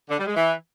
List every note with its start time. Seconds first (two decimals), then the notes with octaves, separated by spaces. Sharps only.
0.09 D3
0.18 G3
0.26 G#3
0.35 E3